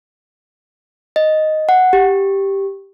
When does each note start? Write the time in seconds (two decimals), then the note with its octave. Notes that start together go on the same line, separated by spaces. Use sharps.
1.16 D#5
1.69 F#5
1.93 G4